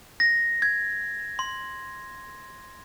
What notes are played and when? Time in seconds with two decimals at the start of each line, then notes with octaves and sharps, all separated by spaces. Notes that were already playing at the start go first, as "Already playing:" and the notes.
0.20 A#6
0.62 G#6
1.39 C6